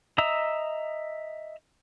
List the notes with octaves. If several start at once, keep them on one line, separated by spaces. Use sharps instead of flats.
D#5 E5 A#5 D#6 E6